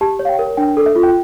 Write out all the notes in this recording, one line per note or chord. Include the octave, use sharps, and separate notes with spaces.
G4 A5
C#5
F5
G5
A#4
D4 G5
A4
E5
F4
G5